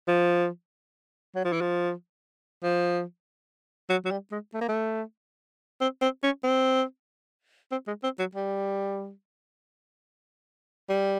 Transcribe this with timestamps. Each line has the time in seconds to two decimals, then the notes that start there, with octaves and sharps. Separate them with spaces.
0.08 F3
1.35 F#3
1.45 F3
1.53 E3
1.61 F3
2.63 F3
3.90 F#3
4.05 F#3
4.11 G3
4.32 G#3
4.54 A3
4.61 A#3
4.69 A3
5.81 C4
6.01 C4
6.23 C#4
6.44 C4
7.71 C4
7.87 G#3
8.04 C4
8.19 F#3
8.35 G3
10.89 G3